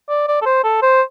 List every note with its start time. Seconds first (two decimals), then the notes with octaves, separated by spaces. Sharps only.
0.09 D5
0.28 D5
0.42 A4
0.46 C5
0.64 A4
0.82 C5